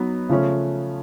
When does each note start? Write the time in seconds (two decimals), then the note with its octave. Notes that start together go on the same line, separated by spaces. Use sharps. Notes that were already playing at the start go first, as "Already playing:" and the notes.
Already playing: F#3 B3 D#4
0.29 C#3 F3 A3 C#4